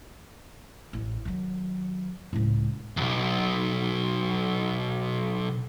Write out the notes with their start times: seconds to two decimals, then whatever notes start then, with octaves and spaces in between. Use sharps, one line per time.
0.93 A1
1.25 D#3 F#3
2.33 C#2 A2
2.97 B1 E2